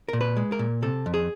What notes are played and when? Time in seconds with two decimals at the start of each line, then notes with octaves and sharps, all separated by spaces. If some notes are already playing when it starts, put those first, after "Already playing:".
0.08 A#2 A#4
0.21 B4
0.37 G#3
0.52 A#4
0.59 A#2
0.82 C3 A4
1.06 F2
1.14 G#4